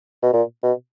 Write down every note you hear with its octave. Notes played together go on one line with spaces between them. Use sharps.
B2
A#2
B2